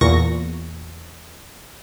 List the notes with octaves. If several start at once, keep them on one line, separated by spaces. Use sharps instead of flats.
E2 A#2 C#6 A#6